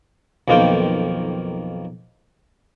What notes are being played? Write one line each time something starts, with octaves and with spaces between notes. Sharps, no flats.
B1 F2 D#3 A#3 F4 G5